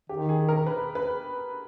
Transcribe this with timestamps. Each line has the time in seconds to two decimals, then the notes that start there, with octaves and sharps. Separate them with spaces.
0.09 D#3 G4
0.29 G#4
0.49 A#4
0.66 B4
0.95 B4